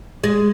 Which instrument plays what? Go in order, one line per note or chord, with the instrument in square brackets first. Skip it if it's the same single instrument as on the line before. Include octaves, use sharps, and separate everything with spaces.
[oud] G#3